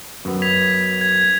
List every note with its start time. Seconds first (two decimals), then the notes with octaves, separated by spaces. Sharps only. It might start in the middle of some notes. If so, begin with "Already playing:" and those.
0.25 F#2 B3
0.42 G#6 B6 F7
1.01 G#6